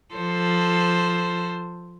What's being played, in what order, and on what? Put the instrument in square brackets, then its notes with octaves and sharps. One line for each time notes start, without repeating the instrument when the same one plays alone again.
[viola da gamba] F3 A4 C5